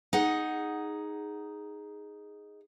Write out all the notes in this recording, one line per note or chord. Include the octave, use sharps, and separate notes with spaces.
D#4 G#4 F#5